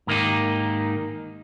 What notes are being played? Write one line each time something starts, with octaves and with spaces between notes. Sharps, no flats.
G#2 D#3 A#3 D#4 G4